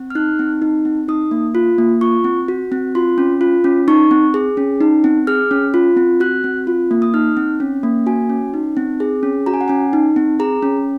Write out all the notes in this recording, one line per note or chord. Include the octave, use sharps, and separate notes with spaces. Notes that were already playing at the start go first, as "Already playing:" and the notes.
Already playing: C4
F6
D#4 F#6
C4
D#4
C4
D#4 D#6
A#3
F4
A#3
F4 C#6
C4
F#4
C4
F4 C6
C#4
F4
C#4
D#4 C#6
C4
G#4
C#4
D#4
C4
G#4 F6
C#4
F4
C4
F#4 F#6
C4
F4
A#3
D#6
D#4 F6
C4
C#4
A#3
F#4 G#5
C#4
D#4
C4
G#4
C#4
F#4 A#5
G#5
F#5
C#4 G#5
D#4
C4
G#4 A#5
C#4